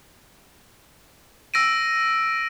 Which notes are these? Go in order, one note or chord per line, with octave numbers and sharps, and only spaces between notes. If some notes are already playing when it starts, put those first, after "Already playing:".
E6 A#6 D7 D#7